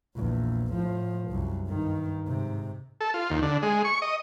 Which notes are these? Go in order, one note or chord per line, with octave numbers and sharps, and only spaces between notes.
A#1 E2
A2 F3
C2 F#2
G2 D#3
G#2 C3
A4
F4
D#2
D3
G#3
C#6
D#5